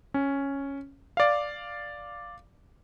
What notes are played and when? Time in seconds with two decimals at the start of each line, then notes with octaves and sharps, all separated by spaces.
0.14 C#4
1.17 D5 F5